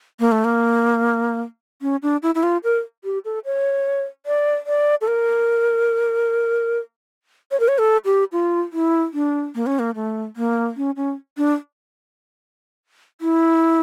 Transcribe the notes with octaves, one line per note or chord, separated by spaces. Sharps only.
A#3
A3
A#3
C#4
D4
E4
E4
F4
A#4
G4
A4
C#5
D5
D5
A4
A#4
C#5
A#4
C#5
A4
G4
F4
E4
D4
A#3
C#4
A#3
A3
A#3
C#4
C#4
D4
E4